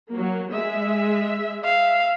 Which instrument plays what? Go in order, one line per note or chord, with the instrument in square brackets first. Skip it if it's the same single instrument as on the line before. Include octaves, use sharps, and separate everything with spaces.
[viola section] F#3 A#3
G#3 E5
[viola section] E5 [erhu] F5